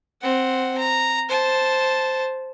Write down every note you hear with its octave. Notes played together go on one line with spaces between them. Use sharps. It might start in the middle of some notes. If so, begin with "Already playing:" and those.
C4 F#5
A#5
C5 A5